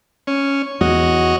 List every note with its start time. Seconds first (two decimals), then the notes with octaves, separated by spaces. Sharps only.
0.27 C#4
0.81 E2 F#4 C#5 D#5